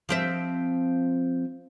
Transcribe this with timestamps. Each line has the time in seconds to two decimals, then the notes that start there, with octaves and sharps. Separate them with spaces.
0.09 F3 C4 E5